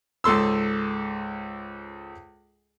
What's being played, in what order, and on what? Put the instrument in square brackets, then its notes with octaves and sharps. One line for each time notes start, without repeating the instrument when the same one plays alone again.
[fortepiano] C#2 G#2 A4 C6 E6